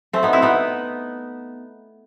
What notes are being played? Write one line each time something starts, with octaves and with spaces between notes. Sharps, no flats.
A3 C4
B3 D#4
C4 E4
B3 D#4